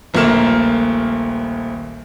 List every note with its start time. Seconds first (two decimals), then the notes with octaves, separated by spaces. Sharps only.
0.14 D#1 A#1 A3 A#3 F6 E7